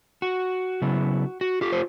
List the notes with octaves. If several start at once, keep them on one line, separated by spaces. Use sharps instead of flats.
F#4
C#3 F#3 B3 E4
F#4
F4 G4
C5